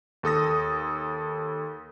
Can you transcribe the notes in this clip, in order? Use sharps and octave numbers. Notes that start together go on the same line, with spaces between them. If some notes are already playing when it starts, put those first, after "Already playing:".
D#2 A4 D#6 A#6